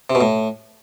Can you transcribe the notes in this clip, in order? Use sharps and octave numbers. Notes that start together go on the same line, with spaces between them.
C3
B2
A2